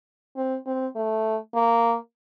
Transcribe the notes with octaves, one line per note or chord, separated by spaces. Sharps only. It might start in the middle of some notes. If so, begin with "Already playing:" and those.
C4
C4
A3
A#3